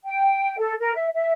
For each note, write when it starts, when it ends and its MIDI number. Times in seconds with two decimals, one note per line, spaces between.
0.04 0.58 79
0.58 0.73 69
0.79 0.92 70
0.95 1.07 76
1.13 1.31 76